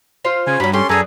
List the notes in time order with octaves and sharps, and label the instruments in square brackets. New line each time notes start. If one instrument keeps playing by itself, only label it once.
[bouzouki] F4 C5 F5
[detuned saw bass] C#3 [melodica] G#5
[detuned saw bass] G2 [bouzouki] F#3 C#4 [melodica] B5
[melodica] C#4 C6 [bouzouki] G4 A4
[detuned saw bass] F#2 [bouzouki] D4 G#4 B4 [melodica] A4 G#5 A#5